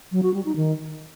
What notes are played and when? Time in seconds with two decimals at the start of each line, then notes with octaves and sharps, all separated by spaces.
0.12 F#3
0.23 F#4
0.34 G3
0.45 D#4
0.56 D#3